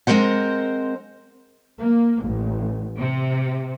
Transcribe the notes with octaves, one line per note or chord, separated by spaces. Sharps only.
G#3 C4 A#4 C5 F#5
A#3
A1
C3